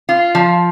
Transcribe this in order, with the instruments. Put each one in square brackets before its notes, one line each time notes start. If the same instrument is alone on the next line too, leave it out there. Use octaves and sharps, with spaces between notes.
[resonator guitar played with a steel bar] F4
F3